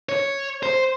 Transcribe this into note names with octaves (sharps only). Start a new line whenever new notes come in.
C#5
C5